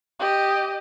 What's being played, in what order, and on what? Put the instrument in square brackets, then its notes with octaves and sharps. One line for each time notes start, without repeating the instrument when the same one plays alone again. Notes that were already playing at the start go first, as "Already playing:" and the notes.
[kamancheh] G4 D#5